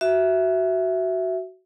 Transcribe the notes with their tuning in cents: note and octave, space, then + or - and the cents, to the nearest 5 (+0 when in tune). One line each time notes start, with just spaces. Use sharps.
F#4 +10 E5 +0